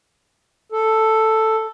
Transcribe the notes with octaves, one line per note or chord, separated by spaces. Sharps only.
A4